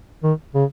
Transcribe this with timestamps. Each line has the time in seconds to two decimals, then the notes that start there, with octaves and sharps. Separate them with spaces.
0.23 D#3
0.55 C#3